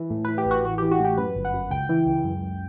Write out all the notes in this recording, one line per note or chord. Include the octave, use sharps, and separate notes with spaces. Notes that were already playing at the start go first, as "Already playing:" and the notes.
Already playing: E3
A2
E3 B4
G4
A1 F#4
E3 F#4
E3 G4
F#4
A2 G4
F#2 B4
G1
F#5
F#2
C#2 G5
E3
C#2
F#2
F#2